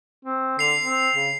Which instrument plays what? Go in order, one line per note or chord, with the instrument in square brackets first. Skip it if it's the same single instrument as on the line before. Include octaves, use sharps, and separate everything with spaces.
[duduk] C4
[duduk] D3 [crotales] C7 F7
[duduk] C4
C#3